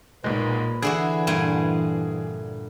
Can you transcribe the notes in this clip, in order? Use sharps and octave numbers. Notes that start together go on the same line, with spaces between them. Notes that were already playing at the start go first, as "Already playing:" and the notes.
B1 A#2 G#3 B4
D3 E3 E4 F#4 G#4
G2 A#2 G#5